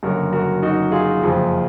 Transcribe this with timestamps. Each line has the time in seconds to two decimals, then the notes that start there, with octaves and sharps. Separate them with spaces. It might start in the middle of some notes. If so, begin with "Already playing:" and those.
0.03 F#1 F#2 D3 F#4 A#4
0.33 F#4 A#4
0.62 D#4 F#4
0.92 F4 G#4
1.22 F#1 F2 F3